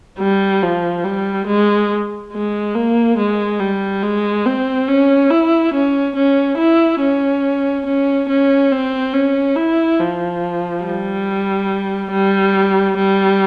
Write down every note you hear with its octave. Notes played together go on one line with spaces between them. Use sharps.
G3
F3
G3
G#3
G#3
A#3
G#3
G3
G#3
C4
C#4
E4
C#4
C#4
E4
C#4
C#4
C#4
C4
C#4
E4
F3
G3
G3
G3